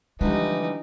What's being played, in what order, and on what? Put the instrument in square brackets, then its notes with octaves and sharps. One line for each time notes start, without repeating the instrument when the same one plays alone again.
[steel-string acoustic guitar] D3 F3 G3 [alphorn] E3 [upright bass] G#3 C4 [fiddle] D#4